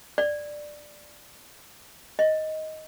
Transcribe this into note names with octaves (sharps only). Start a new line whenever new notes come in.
D5
D#5